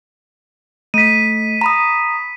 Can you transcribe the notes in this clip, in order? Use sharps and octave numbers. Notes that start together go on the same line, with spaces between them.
A3 B6 D#7
A#5 B5 D#6